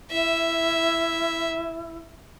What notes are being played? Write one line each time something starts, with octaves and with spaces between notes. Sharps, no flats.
E4 E5